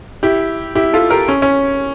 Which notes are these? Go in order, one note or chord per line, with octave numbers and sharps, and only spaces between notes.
E4 G4
E4 G4
F4 A4
G4 A#4
C#4
C#4